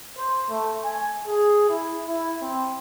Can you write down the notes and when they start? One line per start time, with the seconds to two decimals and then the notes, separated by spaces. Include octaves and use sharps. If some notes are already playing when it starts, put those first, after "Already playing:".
0.18 C5
0.50 A3
0.85 G#5
1.27 G#4
1.69 E4
2.08 E4
2.41 C4